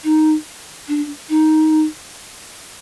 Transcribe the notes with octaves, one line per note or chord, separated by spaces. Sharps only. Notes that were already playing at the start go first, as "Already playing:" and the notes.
D#4
D4
D#4